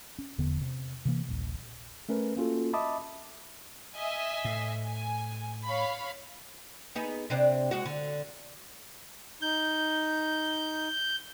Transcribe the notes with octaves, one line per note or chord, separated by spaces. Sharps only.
C#4
F1 E2 D3 B3
C3
C3 E3 A#3
D#1 A#1
A3 C#4 A#4 B4
A#3 C#4 F4 F#4 A4
D#5 E5 A5 B5 D6 D#6
D#5 E5 G#5
A2
G#5
C#5 F5 B5
B3 D#4 G#4
C3 C4 D4
G#3 F#4
D3
D#4 G6